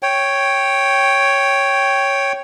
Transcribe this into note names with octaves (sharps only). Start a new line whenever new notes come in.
C#5 G5